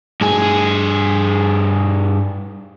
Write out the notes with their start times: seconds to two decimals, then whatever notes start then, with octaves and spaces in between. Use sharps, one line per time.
0.21 G2 G#4